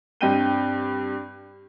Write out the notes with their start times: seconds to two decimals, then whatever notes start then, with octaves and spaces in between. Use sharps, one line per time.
0.21 G2 C4 G5 G6 D#7 G7